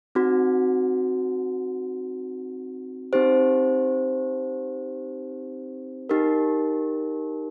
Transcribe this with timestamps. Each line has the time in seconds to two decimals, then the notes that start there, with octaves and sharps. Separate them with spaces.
0.15 C4 D#4 F#4
3.13 C4 D#4 G4 C5
6.09 D#4 G4 A#4